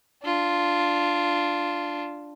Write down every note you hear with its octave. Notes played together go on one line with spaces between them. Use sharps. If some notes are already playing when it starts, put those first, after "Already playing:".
D4 F4